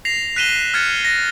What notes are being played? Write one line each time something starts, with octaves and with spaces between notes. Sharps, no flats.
A#6 C7 F7
F#6 B6 D#7 E7 G7
F6 F#6 G#6 A6 C#7
A#6